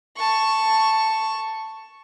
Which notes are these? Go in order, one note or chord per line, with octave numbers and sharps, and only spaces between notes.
A5 C#6